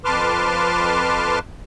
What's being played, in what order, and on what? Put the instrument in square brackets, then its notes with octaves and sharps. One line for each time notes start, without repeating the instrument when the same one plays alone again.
[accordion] F2 B4 A5 C6 D6 F6